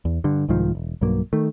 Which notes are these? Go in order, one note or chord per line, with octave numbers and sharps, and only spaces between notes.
E2
G2 D3
C2 G#2 D#3 F3
E1
B1 G2 F#3 A#3
D#3 A3